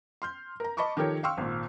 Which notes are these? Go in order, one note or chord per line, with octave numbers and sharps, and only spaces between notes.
C6 F6 G6
A#4 A#5
D#5 A5 B5 C#6 D6
D#3 F3 G4 A4 A#4 C#5
F5 G5 C6 C#6 E6 F6
G#1 A#2